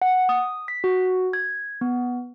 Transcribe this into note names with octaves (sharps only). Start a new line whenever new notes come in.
F#5
D#6
B6
F#4
G#6
B3